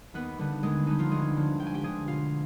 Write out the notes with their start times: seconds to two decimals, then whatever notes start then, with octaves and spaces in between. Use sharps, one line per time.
0.14 D#2 B3 B4
0.38 D3 G3 B3
0.63 D#2 G#3 G#4
0.86 D3 G3 B3 D#4
0.99 F3 F4
1.11 D2 G#3 G#4
1.36 D3 F3
1.59 D2 G5
1.67 G#5
1.74 G4 G5
1.83 D3 F3 G#4 G#5
2.07 B2 F4 F5